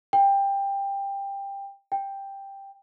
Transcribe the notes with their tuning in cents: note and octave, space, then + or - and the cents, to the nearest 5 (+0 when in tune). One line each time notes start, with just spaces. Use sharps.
G5 +15
G5 +5